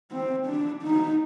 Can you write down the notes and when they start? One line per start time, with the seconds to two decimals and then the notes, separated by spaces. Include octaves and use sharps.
0.11 C4
0.47 D4
0.83 D#4